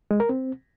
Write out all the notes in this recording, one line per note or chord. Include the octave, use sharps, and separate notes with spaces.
G#3
A#4
C4